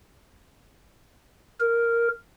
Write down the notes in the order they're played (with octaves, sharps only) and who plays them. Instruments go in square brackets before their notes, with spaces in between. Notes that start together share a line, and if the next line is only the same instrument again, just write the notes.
[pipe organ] A#4